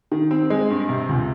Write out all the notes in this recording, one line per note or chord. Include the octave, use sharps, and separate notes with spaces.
D#3
C4
G#3
G2
C3
C#2